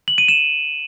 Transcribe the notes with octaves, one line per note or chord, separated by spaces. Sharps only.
F#7
D#7
E7